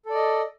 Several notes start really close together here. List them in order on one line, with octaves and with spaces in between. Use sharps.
A4 D5 D#5